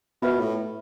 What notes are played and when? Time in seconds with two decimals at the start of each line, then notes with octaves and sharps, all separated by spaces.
0.22 B2 F4 B4 E5 B5
0.39 A2